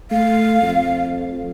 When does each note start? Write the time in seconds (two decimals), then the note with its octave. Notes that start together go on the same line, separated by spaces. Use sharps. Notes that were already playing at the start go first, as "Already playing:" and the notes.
0.11 A3 F5
0.62 F2